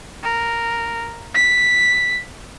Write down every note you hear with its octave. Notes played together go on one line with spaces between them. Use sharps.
A#4
B6